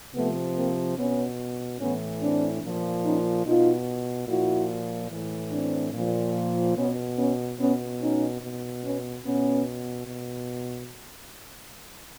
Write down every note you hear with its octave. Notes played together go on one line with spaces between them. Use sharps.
C3 F3 A3 B3
A#3 C4
B2 B3 C#4
A2 E3 B3 C#4
C4 D4
A#2 F3
C#4 D#4
B2 D#4 F4
A#2 F3 E4 F#4
A2 E3
C4 D4
A#2 F3
B2 B3 C#4
B3 C#4
B2 B3 C#4
C#4 D#4
B2
B3 C#4
B2 B3 C#4
B2